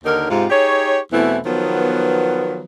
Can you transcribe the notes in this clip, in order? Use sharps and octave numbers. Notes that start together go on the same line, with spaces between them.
D#2 D3 D#4 A#4
G#2 C3 F4
D#4 G4 G#4 C#5
E2 B2 E3 A3 C4 E4
D#3 F3 F#3 B3